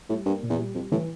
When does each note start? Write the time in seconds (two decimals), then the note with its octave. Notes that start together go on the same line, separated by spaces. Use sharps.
0.09 A2 G3
0.25 G2 A#3
0.43 A#2
0.50 E2
0.58 G3
0.74 F2 G3
0.92 A2 E3